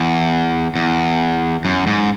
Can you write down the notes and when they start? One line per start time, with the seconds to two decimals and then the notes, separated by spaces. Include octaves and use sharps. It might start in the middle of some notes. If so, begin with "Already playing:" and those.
Already playing: E2
0.76 E2
1.65 F#2
1.87 G#2